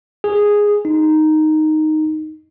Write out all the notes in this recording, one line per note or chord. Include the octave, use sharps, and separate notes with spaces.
G#4
D#4